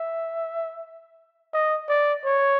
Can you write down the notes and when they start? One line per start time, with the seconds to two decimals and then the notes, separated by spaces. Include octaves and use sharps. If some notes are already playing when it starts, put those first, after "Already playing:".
Already playing: E5
1.53 D#5
1.89 D5
2.25 C#5